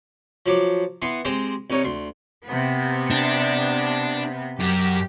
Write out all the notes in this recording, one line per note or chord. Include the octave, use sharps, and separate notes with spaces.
F3 F#3 D6
E3 B3 C6
G#3 C4 G4 C5
C2 D#4 C#5
D2 C6
C3 B3
D4
F#2 G4